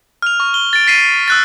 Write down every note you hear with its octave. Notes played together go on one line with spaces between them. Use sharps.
F6 F7
C#6
G7
A6 D7
A6 B6 C7 D#7
E6 F#6 A6